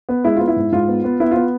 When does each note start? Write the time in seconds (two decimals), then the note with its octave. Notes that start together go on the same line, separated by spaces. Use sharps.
0.09 B3
0.24 G#3 E4
0.36 B3 F4
0.47 E4
0.56 G#2
0.72 G#2 F4
0.88 B3
1.04 B3
1.20 B3 E4
1.31 B3 F4